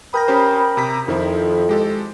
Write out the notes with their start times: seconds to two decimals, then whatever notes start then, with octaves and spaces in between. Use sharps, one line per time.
0.14 A#4 G5 B5 D#6 G6 A#6
0.28 C#4 G4 C5
0.77 C3 A#5 B6
1.08 F2 D#3 F3 E4
1.69 G#3 G4 A4